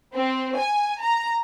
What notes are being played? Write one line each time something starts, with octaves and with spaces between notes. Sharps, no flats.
C4
G#5
A#5